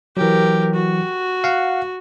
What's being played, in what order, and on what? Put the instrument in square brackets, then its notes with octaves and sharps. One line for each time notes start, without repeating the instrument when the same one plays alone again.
[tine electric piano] E3 F#3 [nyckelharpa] G4 A#4
[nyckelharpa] F#4
[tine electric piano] F5 F#5